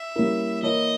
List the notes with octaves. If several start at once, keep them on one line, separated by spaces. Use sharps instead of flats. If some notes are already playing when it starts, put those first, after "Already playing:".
Already playing: E5
G3 A#3 C#4 E4 A#4
E3 A#3 E4 A#4 C#5 D#5